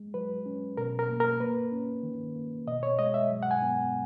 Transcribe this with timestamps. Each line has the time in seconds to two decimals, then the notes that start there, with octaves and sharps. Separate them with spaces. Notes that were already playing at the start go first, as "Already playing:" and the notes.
Already playing: G#3
0.14 F#3 B4
0.46 C#4
0.77 B2 A#4
0.99 A#4
1.09 A#3
1.20 A#4
1.40 A#3 B4
1.72 C#4
2.03 D#3
2.35 A#3
2.67 B2 D#5
2.83 C#5
2.99 G#3 D#5
3.14 E5
3.30 F#3
3.43 F#5
3.51 G#5
3.62 B3